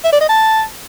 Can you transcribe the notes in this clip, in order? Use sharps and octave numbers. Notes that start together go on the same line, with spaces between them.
E5
D5
D#5
A5